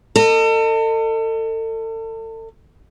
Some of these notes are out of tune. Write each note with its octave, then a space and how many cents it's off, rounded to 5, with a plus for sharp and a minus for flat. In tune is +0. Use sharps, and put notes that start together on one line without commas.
A4 +35 D#5 -15